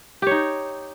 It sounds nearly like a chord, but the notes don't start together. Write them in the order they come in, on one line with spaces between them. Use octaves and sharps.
G4 C#5 D#4